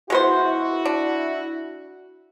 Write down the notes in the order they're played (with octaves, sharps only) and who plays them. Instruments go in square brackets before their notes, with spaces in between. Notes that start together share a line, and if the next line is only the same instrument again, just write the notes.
[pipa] G#3 B3 C5 [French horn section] E4 F#4
[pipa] D4